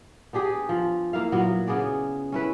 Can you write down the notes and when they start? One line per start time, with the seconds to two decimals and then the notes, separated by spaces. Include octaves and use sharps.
0.33 B3 D4 G4 G#4
0.69 F3
1.13 A#3 E4 F5
1.32 A#2 F#3 B3
1.68 C#3 B3 G#4 D5
2.32 C#4 E4 B4